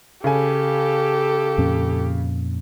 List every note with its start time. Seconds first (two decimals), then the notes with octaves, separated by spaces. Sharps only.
0.24 C#3 G4 A4 G#5
1.58 F2 A#2 C#4